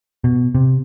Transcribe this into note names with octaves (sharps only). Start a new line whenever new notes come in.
B2
C3